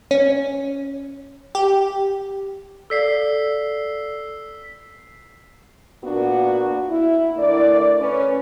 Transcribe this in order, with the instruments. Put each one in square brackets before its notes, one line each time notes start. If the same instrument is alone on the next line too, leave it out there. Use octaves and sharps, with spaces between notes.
[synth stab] C#4
G4
[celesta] A4 D5 F5 [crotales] E6 B6 C7
[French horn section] A#2 A#3 B3 D4 F#4
E4
D3 A3 A#4 D5
C#4 B4